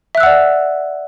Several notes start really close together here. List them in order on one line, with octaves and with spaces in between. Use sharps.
E5 F#6 E6 F#5 D5